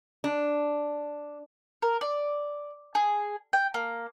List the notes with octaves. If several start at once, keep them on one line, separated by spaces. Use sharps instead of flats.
D4
A#4
D5
G#4
G5
A#3